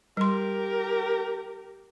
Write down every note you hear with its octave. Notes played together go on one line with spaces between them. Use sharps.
G3 G4 A#4 C6